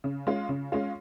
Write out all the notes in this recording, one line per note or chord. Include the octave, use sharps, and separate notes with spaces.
C#3
G#3 C#4 F4
C#3
G#3 C#4 F4